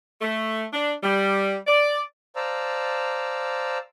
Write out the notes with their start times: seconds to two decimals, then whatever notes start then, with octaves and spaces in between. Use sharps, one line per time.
0.21 A3
0.73 D4
1.03 G3
1.67 D5
2.36 C5 D5 F5 A5 A#5 E6